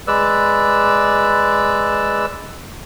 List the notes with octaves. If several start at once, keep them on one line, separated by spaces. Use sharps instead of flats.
G#3 B4 D5 E6